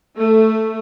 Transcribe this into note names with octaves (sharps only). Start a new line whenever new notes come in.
A3